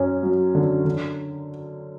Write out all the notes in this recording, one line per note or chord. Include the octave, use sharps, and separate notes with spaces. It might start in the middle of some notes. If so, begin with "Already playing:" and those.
Already playing: F#2 C#4
F#3
D3
D3